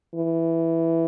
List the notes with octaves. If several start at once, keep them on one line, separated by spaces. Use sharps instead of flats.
E3